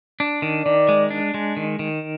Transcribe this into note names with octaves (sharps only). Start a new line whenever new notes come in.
D4
D#3
D#3 D5
G#3
D4
G#3
D#3
D#3